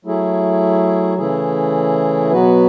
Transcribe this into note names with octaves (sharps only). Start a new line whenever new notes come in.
F#3 A3 E4 G#4
C#3 E3 A3 E4 G#4
B2 F#3 B3 F#4 B4